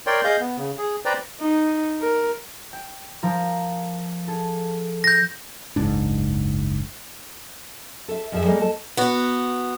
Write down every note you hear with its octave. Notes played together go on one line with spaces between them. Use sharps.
A#4 C#5 D5 G5 C6
G#4 D#5 F5 G6
B3
C#3
G#4
B4 C5 D5 G5 A#5
D#4
A#4
G5
F3 A#4
G#4 A4
G6 A#6
F#1 C#2 G#2 D4
A4 E5
F2 F3 G#4 A4 E5
G3 G#3 A#3 B3 A4 A#4
A4 D#5 A5
B3 F#4